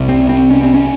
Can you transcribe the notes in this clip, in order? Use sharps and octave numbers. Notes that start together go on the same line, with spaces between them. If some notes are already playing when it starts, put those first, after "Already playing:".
Already playing: C2 C3
C4
C4
C#4
C4
C#4